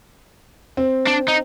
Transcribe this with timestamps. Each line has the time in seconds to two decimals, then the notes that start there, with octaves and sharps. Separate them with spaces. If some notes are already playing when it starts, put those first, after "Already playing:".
0.77 C4
1.07 D4
1.28 D#4